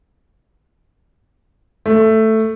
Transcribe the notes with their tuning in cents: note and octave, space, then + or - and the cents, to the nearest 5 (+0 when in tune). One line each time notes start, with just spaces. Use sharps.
A3 +5